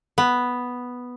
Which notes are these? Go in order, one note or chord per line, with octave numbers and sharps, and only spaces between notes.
B3